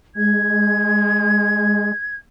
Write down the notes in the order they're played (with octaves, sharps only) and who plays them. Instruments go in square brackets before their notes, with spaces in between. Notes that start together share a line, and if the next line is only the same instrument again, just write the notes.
[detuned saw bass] G#3 [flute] G#6